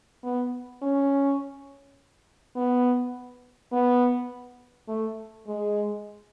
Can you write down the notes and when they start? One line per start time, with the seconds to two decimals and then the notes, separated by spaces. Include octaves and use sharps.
0.24 B3
0.82 C#4
2.56 B3
3.72 B3
4.88 A3
5.47 G#3